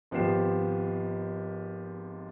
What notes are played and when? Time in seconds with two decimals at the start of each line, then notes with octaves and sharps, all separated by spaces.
0.11 G#1 F3 B3 G4 C7 E7